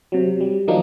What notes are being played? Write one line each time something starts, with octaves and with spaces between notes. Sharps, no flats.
C3 F#3
G3
D#3 F3 F#3 A#3 D4 D#4